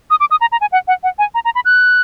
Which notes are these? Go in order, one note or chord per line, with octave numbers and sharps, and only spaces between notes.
D#6
D6
D#6
A#5
A#5
G#5
F#5
F#5
F#5
G#5
A#5
A#5
B5
F#6